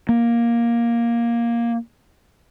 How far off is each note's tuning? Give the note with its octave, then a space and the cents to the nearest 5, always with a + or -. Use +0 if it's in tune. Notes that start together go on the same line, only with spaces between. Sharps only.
A#3 +10